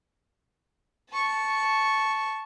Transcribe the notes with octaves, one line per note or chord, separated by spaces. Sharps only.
A5 C#6